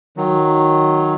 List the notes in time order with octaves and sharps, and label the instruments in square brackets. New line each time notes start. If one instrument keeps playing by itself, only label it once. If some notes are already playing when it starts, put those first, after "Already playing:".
[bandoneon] D#3 F#3